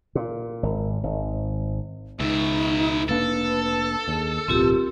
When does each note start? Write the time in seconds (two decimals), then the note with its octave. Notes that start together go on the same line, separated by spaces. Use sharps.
0.15 A#2
0.63 G#1
1.04 G#1
2.20 C#2 B2 D#4 E4
3.09 F1 A#3 D4 A4 B4
4.08 D#2 G#4
4.48 D1 B1 C4 F4 G4 A#4